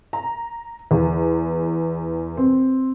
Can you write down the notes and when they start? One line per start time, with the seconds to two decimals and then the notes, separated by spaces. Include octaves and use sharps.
0.13 A#5
0.91 E2
2.37 C4